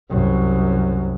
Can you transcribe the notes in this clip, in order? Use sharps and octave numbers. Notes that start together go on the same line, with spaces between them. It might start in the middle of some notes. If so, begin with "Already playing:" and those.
C2 F#2